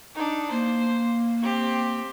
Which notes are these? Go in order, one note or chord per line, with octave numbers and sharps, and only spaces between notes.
D4 D#4
A#3 C5
C4 G4